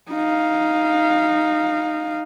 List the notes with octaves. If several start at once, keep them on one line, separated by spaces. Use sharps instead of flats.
D#4 F5